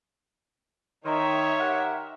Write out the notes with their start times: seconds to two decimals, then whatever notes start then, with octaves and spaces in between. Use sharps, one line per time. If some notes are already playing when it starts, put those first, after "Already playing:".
1.05 D#3 D#4 C#5 E5 A#5 C6
1.59 G4 A#4 F#5